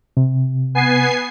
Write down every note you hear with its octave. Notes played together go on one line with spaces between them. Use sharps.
C3
B3 G#5 C7